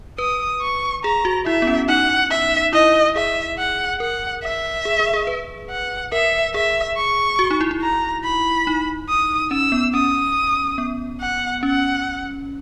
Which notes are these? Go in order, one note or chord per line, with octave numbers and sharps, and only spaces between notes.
B4 D#6
C#6
G#4 A#5
F#4
E4 E5
B3
C#4
D#4 F#5
E5
E4 D#5
G#4 E5
F#5
A#4 F#5
E5
G#4
G#4
G#4
B4
F#5
A#4 E5
G#4 E5
C#6
F#4
D#4
E4
E4
A#5
B5
D#4
D#6
C#4 E6
B3
C#4 D#6
B3
F#5
C#4 F#5